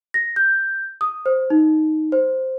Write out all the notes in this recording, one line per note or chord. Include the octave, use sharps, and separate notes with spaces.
A#6
G6
D#6
C5
D#4
C5